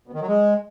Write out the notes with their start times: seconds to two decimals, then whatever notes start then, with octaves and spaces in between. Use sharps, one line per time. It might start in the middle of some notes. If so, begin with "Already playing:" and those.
0.08 B2
0.14 D#3
0.21 F#3
0.28 G#3